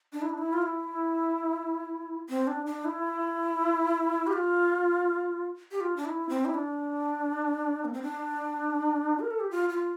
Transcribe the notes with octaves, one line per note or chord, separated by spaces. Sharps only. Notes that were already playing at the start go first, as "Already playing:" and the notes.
D4
E4
D4
E4
F4
E4
C4
D4
D4
E4
G4
F4
G4
F4
D4
E4
C4
E4
D4
A#3
C4
D4
A#4
A4
G4
F4
F4